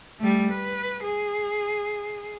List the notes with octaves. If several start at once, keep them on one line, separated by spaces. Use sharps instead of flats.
G3 A3
B4
G#4